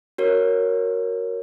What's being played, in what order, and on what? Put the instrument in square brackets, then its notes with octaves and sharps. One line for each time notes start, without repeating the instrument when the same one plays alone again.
[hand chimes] F#4 A#4 C#5